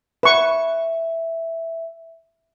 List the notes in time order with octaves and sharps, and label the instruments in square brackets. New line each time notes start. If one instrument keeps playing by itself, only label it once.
[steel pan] B4 C#6 [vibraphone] E5